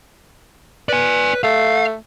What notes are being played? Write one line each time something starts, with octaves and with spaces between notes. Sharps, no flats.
B4 D5 G#5
A3 F5